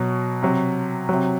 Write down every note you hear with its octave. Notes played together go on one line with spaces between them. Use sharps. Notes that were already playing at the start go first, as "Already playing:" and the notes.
Already playing: B2 F#3
C3 F#3
C3 F#3